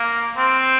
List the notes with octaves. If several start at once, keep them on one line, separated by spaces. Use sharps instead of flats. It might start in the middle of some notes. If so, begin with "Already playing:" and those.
Already playing: A#3
C4